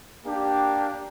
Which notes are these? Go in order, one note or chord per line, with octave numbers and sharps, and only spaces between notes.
A#3 D4 G4